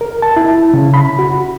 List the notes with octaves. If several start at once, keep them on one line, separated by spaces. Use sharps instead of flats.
A#4
A5
E4
C#3
B5
F#4